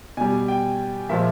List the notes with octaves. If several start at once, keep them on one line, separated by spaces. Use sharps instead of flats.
B2 G3 G#5
G5
A#2 F3 G#3 E5